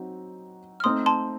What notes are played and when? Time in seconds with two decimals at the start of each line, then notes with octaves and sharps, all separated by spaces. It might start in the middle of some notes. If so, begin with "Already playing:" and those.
Already playing: F#3 C4 D#4 F#4
0.80 F6
0.84 A3 C4 D#4 C6 D#6
1.06 A5 C6